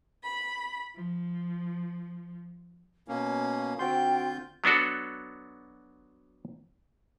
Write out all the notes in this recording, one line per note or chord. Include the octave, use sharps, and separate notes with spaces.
B5
F3
B2 A#3 C#4 F5
D3 C4 F4 F#4 G5 C6 G6
F#3 B3 D4 F#4 A4